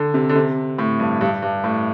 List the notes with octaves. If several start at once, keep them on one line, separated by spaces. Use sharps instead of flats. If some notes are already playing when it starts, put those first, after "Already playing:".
Already playing: D3
C3
D3
C3
A2
G2
G2
G2
A2